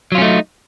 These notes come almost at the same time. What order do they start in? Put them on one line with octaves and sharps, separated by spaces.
F#3 F4 C#4 A3 D#4